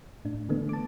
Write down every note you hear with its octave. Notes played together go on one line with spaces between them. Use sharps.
A2 D4
D3 E3 A3 B3 D4
A5 D6